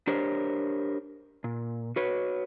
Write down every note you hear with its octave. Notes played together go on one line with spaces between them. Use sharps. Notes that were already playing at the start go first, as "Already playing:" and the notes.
D4 G4 A#4 C5 C#5
A#2
F#4 B4 C#5